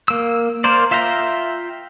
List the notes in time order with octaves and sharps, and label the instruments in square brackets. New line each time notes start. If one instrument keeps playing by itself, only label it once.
[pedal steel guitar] A#3 E6
A#3 A#4 C5 D5
F4 E5 F5 G5 A#5